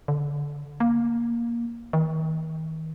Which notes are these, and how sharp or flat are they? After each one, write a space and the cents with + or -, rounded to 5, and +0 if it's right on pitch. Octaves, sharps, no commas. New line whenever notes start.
D3 -15
A#3 +10
D#3 +40